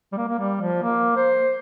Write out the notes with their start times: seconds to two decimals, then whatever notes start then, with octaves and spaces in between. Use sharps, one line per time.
0.12 G3
0.17 A#3
0.28 A#3
0.39 G3
0.61 F3
0.82 A#3
1.16 C5